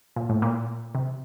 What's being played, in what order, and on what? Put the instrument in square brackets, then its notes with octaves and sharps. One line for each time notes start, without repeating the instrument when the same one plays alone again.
[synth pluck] A#2
A2
A#2
C3